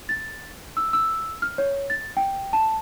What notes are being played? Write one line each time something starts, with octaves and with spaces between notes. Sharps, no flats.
A6
E6
E6
F6
C#5
A6
G5
A5